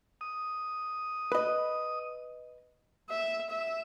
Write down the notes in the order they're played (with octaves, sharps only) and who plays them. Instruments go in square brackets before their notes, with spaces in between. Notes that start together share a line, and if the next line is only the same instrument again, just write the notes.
[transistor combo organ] D#6
[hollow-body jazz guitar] B4 D#5
[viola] E5
E5